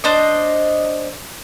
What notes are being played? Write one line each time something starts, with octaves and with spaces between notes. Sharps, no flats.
D4 C5 D#5